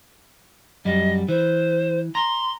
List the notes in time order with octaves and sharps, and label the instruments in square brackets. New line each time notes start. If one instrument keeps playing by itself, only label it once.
[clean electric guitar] F#2 G3 [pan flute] D#5
[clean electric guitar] E3 [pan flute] C5
[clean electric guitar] A#5 [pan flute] C6